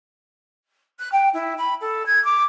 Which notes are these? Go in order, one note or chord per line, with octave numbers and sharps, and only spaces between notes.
F#6
G5
E4
B5
A4
G#6
D6